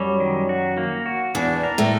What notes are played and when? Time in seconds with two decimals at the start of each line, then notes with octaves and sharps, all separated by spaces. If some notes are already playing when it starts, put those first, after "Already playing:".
Already playing: F#2 F#3 G3
0.20 D#3
0.49 F#4
0.78 A#3
1.06 F#4
1.35 E2 E3 D4
1.63 A#4
1.78 A2 A3